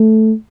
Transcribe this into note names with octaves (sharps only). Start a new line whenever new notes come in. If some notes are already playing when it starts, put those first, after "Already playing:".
Already playing: A3